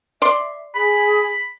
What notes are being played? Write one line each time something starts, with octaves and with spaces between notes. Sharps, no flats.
D5 E5 C6
G#4 B5